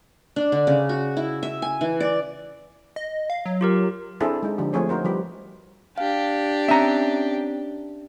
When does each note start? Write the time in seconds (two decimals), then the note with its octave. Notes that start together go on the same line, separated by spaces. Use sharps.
0.36 D4
0.52 D3
0.67 C#3
0.89 F#4
1.17 E4
1.43 E5
1.62 G#5
1.81 E3
2.00 D5
2.96 D#5
3.30 F5
3.46 F#3
3.61 F4 G4 A#4
4.20 C4 D4 E4 G#4 A4 C5
4.43 G#3 D#4
4.58 D3 F3 D4 G4
4.73 F3 A3 C4 G#4 C#5
4.89 D#4 F#4 A#4 C5
5.04 F3 G3 G4 B4
5.98 D4 G4 F5
6.68 C4 C#4 E5 A#5